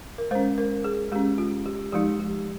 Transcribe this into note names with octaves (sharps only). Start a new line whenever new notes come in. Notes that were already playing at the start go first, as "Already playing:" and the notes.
A#4
G#3 C#4 C5
A#4
G#4
G#3 C#4 G4
F4
G4
F3 G#3 D#4 G4
G4